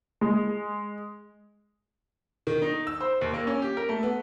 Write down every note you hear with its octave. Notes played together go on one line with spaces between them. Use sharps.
G#3
D#3
D#4
E6
C5
D#2
A#3
C#4
G4
A#4
A3
B3